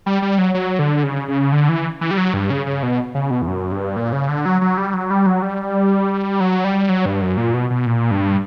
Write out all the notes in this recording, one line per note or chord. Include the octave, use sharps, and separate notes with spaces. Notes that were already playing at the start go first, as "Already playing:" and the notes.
G3
G3
F#3
F#3
D3
C#3
C#3
D3
E3
E3
G3
F#3
G2
C#3
C#3
B2
C#3
B2
E2
F#2
G2
A#2
C#3
D3
F#3
F#3
G3
F#3
G3
F#3
G3
F#3
G3
F#3
G2
F#2
A#2
B2
B2
A#2
G2